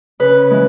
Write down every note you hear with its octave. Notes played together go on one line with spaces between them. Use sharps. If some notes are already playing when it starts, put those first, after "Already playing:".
C#3 B4
E3 G#3